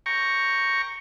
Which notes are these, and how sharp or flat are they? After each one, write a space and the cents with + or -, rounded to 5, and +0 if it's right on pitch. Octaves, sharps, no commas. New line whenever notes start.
G5 +0 A#5 +0 C#6 +0